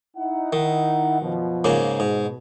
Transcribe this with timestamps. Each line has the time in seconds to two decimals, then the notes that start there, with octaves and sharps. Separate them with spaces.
0.17 D#4 E4 F#5
0.53 D#3
1.22 F#2 B2 F3
1.64 G#2 C#3 A#3
2.00 G#2 B2